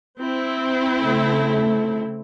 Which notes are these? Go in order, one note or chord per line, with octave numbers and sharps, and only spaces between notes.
C4 E4
C#3 A3